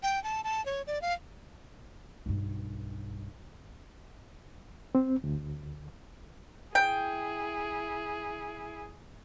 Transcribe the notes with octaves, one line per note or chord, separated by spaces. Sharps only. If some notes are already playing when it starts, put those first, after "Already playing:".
G5
A5
A5
C#5
D5
F5
B1 G2
C4
D2
E4 G#4 G5